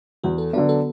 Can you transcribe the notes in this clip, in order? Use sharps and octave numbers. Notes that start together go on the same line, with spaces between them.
E2 F#4
A4
D3 F#3 B3 D4 B4
A4